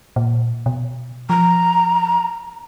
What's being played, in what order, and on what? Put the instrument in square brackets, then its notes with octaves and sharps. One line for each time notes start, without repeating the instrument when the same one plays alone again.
[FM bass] A#2
B2
[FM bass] F3 [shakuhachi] A#5